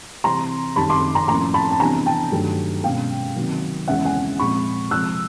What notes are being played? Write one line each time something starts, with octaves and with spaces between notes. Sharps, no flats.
C3 E3 G3 C4 A#5 C6
F#2 D#3 G3 A5 B5
C6 D6
A#5 C6
A2 F3 A#3 C#4 A#5 C6
A5 B5
A5
C3 E3 G3 B3 D4 G#5 A#5
G5 A5
G2 D#3 F#3 A3
B2 G#3 C#4 F5 G5
C3 D#3 F#3 A#3
E2 C#3 E3 G#3 C#4 E5 F#5
F#5 G#5
A#2 F3 G#3 C4 B5 C#6
C3 F3 G#3 E6 F#6